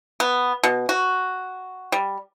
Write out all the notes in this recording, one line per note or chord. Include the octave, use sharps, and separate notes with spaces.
B3
B2
F#4
G3